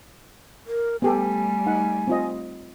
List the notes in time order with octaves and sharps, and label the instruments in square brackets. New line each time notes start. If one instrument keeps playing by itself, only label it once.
[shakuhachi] A#4
[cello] G3 A3 [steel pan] B3 G4 A4 [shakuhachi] G#5
[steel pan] D#4 F#5
C4 F4 D#5